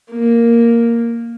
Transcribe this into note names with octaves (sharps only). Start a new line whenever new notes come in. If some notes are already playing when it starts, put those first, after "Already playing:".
A#3